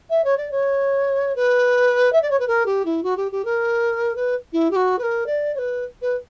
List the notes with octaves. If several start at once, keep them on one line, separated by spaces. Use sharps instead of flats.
E5
C#5
D5
C#5
B4
E5
D5
C#5
B4
A#4
G4
E4
F#4
G4
G4
A#4
B4
E4
G4
F#4
B4
A#4
D5
C#5
B4
B4